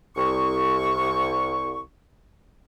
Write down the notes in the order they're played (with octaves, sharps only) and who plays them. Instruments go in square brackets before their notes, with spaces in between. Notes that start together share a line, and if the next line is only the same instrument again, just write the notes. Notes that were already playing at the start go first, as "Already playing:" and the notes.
[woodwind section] C2 C#6